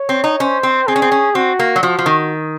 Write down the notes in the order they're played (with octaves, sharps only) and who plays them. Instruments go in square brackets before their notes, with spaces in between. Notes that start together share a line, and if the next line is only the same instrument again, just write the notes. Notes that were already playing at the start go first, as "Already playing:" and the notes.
Already playing: [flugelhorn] C#5
[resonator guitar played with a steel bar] C4
D#4
[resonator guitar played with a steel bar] C#4 [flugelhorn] C5
[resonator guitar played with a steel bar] C4
[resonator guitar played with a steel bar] C4 [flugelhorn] G#4
[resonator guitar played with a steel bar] C#4
C4
C#4
[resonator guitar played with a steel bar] C4 [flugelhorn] F#4
[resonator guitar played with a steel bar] A#3
F#3
[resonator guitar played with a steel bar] F3 [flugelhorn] F#4
[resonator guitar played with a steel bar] F3
D#3